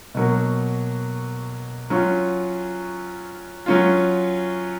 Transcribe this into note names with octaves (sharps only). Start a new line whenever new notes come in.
B2 F#3 A#3
F#3 C#4 F4
F#3 C#4 F4